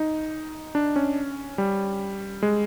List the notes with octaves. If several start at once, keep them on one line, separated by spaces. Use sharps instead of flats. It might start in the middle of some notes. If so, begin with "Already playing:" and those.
Already playing: D#4
D4
C#4
G3
G#3